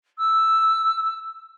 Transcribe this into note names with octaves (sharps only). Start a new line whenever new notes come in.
E6